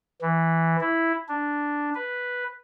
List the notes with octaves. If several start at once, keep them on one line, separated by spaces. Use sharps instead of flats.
E3
E4
D4
B4